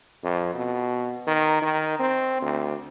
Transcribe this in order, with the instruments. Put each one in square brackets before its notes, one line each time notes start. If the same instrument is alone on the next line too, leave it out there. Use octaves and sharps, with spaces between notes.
[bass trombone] F2
B2
D#3
D#3
C4
D2